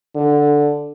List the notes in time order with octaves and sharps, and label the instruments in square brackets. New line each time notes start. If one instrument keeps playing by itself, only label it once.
[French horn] D3